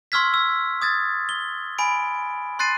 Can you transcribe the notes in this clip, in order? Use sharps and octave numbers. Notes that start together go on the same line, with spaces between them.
C6 C#6 E6 F6 G#6 B6
E6
D#6 G#6 A6
G7
G#5 B5 D7
C6 F#6 A6 C7 D#7